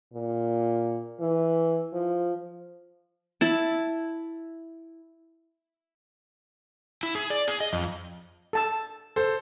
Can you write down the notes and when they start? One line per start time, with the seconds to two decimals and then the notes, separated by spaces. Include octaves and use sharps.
0.14 A#2
1.21 E3
1.93 F3
3.41 E4 A5
7.03 E4
7.15 G#4
7.30 D5
7.48 G#4
7.60 D#5
7.73 F2
8.53 A4 A5 E6
9.16 A4 C5